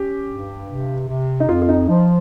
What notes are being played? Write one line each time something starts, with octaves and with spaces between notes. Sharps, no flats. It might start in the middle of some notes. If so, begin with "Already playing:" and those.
Already playing: C#4 G4
G2
C3
C3
D#4
F2 F4
F4
D#4
F3 D#4